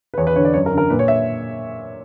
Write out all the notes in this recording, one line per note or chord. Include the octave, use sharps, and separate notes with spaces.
B4
E2 C#5
B4
D3 C#5
D5
F#2 C#5
A#4
D3
A#4
A#2 B4
C#5
E5